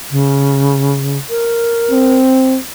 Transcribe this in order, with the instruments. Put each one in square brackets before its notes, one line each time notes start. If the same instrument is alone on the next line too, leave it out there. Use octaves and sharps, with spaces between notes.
[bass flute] C#3
A#4
[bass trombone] C4